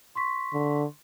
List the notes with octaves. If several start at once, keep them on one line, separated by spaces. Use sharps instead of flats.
C6 C#6 B6
D3